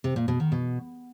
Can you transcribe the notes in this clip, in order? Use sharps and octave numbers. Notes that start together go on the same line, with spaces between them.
C3
A#2
B2
D#3
B2